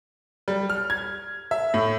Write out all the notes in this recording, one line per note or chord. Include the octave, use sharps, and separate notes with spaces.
G3
F6
G#6
E5
A2